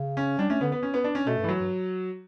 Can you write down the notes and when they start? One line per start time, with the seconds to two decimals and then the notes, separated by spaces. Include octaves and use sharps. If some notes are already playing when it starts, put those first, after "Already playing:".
Already playing: C#3
0.17 C#4
0.39 G3 D4
0.50 A3 C#4
0.61 D3 B3
0.72 B3
0.83 C#4
0.94 B3
1.04 D4
1.15 C#4
1.26 B2 A3
1.38 G2
1.44 E3
1.48 F#3
1.59 G2